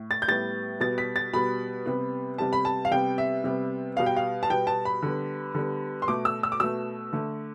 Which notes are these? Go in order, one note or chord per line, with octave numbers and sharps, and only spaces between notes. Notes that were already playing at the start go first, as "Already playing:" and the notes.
Already playing: A2
A6
G6
A2 G3 B3 A6
B2 G3 B3 A6
B6
A6
B2 G3 B3 B5
C3 G3 B3
C3 G3 B3 A5
B5
A5
F5
C3 G3 B3 G5
E5
C3 G3 B3
B2 G3 B3 F5
G5
F5
A5
B2 G3 B3 G5
A5
B5
D3 G3 B3
D3 G3 B3
C6
B2 A3 D6
E6
E6
D6
B2 A3 E6
D3 A3